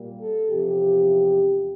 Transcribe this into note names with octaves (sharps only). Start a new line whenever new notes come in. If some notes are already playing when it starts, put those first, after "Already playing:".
Already playing: A#2 G3 A#3
A4
E2 C3 F3 G4